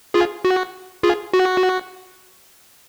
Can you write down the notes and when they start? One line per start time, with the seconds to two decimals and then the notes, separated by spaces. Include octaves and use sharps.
0.14 F4 G#4
0.45 F#4
1.03 F4 G#4
1.34 F#4